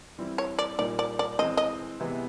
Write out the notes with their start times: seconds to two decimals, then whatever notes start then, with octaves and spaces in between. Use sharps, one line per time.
0.18 E3 G3 C4 E4
0.38 C#5
0.59 D5
0.79 A#2 G3 A#3 D#4 D5
0.99 D5
1.19 D5
1.39 E3 G#3 C4 D#5
1.57 D#5
2.00 C3 E3 G#3 B3 E4